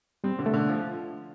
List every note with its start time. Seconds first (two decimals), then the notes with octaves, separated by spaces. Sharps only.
0.24 G3 C4
0.39 D3
0.46 A3
0.53 D3
0.69 F3